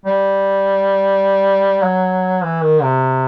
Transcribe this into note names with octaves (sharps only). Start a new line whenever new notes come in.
G3
F#3
E3
D#3
C3